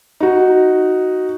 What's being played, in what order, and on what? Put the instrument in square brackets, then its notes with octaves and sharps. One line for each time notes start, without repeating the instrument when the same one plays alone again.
[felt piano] D#4 F#4